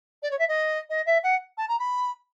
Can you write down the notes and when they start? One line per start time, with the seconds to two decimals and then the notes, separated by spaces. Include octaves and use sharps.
0.22 D5
0.31 C#5
0.39 E5
0.48 D#5
0.90 D#5
1.06 E5
1.23 F#5
1.57 A5
1.68 A#5
1.79 B5